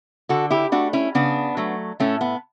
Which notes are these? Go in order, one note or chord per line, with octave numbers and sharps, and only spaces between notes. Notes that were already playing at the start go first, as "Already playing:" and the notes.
D3 F#4 A4
E4 G4
A3 D4 F#4
C#4 E4
C#3 B3 D4
F#3 A3
A2 A3 C#4
B3